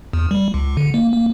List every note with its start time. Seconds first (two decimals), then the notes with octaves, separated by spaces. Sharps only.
0.13 E2
0.31 G3
0.54 C#2
0.77 D3
0.94 A#3
1.12 A#3